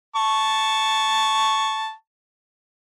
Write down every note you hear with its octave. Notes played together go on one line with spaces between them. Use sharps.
A5 C#6